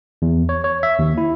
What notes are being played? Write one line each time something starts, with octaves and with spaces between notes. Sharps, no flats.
E2
C#5
C#5
E5
D#2
E4